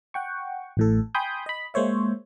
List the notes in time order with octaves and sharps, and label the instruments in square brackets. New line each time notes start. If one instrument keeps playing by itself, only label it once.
[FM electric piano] F#5 G5 C#6
A1 A2 A4
G5 G#5 B5 C6 D#6 G6
D#5 B5
G#3 A#3 C5 C#5 E5